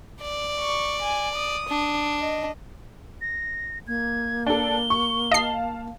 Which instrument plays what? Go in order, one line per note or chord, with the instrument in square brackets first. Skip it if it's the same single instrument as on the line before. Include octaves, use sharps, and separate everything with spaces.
[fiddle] D5
[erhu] C#6
G#5
D#6
[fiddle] D4
[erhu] D#5
[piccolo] A#6
[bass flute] A#3 [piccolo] G#6
[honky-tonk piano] D4 A4 [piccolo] G7
[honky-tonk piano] C#6
[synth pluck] D#5 C7 [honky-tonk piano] F5 A5